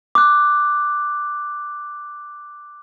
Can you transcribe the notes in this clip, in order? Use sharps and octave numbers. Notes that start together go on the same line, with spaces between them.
D6 F#6